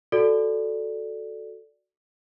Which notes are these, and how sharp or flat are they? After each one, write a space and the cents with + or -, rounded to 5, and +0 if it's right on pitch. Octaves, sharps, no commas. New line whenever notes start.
F#4 +0 A4 +0 D5 +0